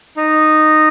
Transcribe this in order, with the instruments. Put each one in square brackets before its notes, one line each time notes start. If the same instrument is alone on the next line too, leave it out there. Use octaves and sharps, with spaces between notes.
[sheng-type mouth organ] D#4